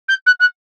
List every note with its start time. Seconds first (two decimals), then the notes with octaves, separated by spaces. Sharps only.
0.08 G6
0.26 F#6
0.40 F#6